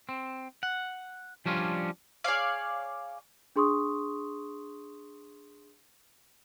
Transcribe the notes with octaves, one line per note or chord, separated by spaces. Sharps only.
C4
F#5
F3 G3 C#4 D4 F4
G#4 C#5 D5 F5
D4 G#4 C6 C#6 D#6